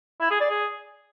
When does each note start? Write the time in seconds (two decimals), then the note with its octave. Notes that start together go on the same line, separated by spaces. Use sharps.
0.21 E4
0.31 G#4
0.40 D5
0.50 G#4